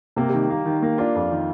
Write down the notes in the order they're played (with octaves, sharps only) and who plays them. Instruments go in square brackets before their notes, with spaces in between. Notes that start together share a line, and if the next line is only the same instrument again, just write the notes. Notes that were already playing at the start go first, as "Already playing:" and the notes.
[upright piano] C3 [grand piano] A#3
[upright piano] D#3 [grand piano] G3
[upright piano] A#3
D#3
A#3
[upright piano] D4 [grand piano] F4
[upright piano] F2
D#3